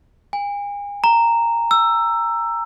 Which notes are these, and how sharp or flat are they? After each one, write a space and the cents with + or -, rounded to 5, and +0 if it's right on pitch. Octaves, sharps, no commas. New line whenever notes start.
G#5 -40
A#5 -10
E6 +15